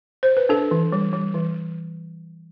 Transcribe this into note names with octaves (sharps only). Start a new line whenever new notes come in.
C5
B4
D4 A4
E3
G3
G3
E3